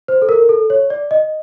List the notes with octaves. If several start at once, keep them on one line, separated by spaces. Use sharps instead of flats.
C5
A4
A#4
A4
C#5
D5
D#5